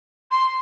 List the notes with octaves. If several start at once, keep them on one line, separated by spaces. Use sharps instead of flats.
C6